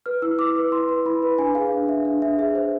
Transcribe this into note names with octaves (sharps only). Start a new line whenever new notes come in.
B4 F6
E4 E6
E4 D6
B4
E4 C6
B4
E4 B5
B4
D4 G#5
G#4 F5
D4
D4 E5
D4
D4 E5
G#4 E5
C5